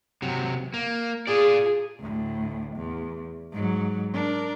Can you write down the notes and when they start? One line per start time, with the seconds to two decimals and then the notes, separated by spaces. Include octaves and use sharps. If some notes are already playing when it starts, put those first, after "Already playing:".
0.22 C3 F#3
0.74 A#3
1.27 F4 G#4 D5
1.99 D2 A2
2.76 E2
3.52 G#2 F#3
4.14 D4 A#4